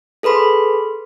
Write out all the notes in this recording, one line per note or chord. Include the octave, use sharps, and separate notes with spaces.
G#4 A4 B4 B5 C6